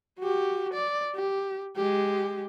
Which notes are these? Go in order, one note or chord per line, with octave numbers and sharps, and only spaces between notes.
F#4 G4
D5
G4
G#3 G4